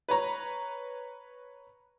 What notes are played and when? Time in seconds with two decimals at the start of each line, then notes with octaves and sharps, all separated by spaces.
0.09 B4 C#5 A#5